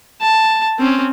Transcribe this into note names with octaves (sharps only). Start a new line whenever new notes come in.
A5
C4 C#4